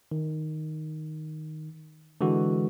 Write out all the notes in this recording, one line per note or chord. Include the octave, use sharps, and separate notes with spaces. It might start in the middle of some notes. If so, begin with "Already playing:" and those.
D#3
D3 E3 G#3 F#4